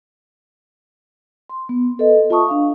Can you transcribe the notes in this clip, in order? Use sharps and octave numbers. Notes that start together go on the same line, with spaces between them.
C6
B3
A4 B4 D#5
F4 E5 A5 C#6 D#6
D4 F5